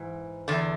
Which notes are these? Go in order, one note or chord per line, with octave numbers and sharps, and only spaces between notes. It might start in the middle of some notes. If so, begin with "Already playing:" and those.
Already playing: G#2 E3
E2 D3